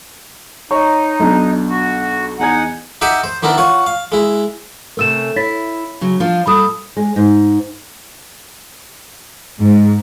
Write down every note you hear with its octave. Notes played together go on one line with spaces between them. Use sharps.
D#4 C#5 C#6
B1 B2 D4
F#4
E2 D#4 F#5 G#5 G#6
D#4 G4 D#5 E5 F#5 G5
C5
D#3 B3 D4 E4 A#4
F4 C#5 F#5
F5
G#3 E4
C3 A3 C#4 A#4 E6 E7
E4 C#5 A6 B6
C#3 F#3
F3 D4 F4
A#2 G3 A4 B5 D#6
G#3
G#2
G#2